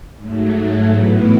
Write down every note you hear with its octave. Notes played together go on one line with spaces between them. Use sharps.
G#2 F#3 A3
A2 E3 B3 E4